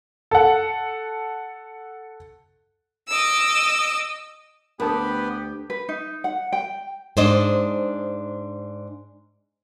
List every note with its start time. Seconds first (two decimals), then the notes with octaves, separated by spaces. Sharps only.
0.31 A4 F#5
3.08 D#5 D6 E6
4.80 D2 B3 G4 A#4 B4 A5 D#6
5.70 B4
5.89 D#4
6.24 F#5
6.53 G5
7.17 G#2 D4 C5 D#5